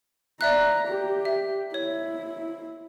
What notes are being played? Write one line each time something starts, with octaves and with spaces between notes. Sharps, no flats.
D5 E5 A#5 F#6
G4
E5
E4 C#5